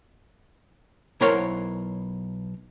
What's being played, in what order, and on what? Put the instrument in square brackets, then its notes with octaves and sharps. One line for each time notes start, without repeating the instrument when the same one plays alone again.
[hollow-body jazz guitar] B1 E4 A#4 C5 C#5 F#5